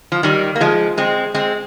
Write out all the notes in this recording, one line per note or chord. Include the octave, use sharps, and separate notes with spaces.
F3
D#3 G3
A#3
F3 G#3
G#3 C4
G#3 C4